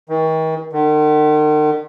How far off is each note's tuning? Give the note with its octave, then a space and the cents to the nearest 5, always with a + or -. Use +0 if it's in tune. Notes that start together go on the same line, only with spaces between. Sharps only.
D#3 +40
D#3 -45